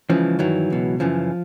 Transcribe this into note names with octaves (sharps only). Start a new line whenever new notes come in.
C#2 C#3 E3 F3
G2 D#3 E3 F#3
C#2 B2
F#2 C#3 E3 F3